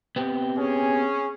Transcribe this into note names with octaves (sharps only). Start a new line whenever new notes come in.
B3 C4 G4
C#4 G#4